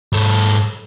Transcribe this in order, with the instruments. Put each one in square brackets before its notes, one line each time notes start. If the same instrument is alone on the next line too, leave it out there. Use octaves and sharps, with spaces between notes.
[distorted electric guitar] G#2 A4